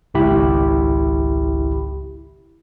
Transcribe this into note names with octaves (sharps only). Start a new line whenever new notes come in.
G#1 C#2 E4 G4 B5